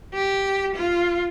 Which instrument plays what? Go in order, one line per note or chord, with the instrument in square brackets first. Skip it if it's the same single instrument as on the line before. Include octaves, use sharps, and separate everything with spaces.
[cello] G4
F4